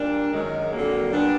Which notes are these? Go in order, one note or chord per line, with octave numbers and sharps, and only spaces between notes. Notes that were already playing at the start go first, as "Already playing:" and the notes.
Already playing: A#2 G3 A#3 D4
F#2 D#3 G#3
F2 D3 F#3 A#3
A#2 G3 B3 D4